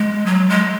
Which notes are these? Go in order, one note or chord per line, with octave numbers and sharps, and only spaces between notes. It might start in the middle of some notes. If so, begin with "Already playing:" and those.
Already playing: G#3
F#3
G#3